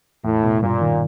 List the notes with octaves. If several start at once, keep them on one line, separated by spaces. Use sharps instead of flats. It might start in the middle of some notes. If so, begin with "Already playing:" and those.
E2 A2
B2
G2 A#2
D#3